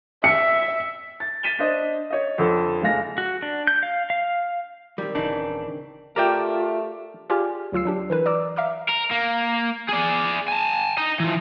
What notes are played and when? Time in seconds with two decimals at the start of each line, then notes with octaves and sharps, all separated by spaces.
0.24 E5 C#7
1.20 A6
1.43 A6 B6 D#7 E7 G7
1.59 D4 C5 D#5
2.10 C#5 D#5
2.38 F2 D3 A4
2.82 F#1 G#3 F5 A#6
3.18 F#4
3.42 D4
3.67 G6
3.83 F5
4.10 F5
4.98 D#3 G3 C4
5.15 D1 C#3 E3 D4 D#4
6.16 A3 F4 G4 A#4 D5 E5 G5
7.30 F4 G4 G#4 D5 G#5 F6
7.72 D2 F#3 F4 E6 C7
7.85 F#3 D4 G4
8.10 E3 A#4 B4
8.26 D5 A#5 D6 E6
8.56 E5 F5 A#5 D6 F6
8.89 A#4
9.11 A#3
9.89 G#4 D5
10.48 G#5 A5
10.97 D#5 A#5
11.20 E3 F3